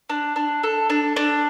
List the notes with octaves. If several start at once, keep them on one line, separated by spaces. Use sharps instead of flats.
D4
D4
A4
D4
D4